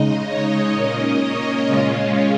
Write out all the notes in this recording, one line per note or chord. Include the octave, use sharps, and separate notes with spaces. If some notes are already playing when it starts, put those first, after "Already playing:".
Already playing: C#3 G#3 D#4 D#5
C#5
A#2 A#3 C#4 D#5
C#5
C#3 G#3 C#4 F4